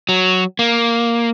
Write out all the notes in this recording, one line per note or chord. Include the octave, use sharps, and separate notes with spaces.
F#3
A#3